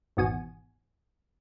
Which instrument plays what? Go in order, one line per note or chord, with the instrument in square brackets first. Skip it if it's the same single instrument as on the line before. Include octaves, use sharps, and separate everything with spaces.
[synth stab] G#1 E2 B2 F#4 G#5